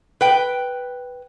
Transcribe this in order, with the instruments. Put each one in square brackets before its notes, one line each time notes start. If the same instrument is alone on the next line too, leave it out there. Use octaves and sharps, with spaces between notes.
[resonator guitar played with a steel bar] B4 G5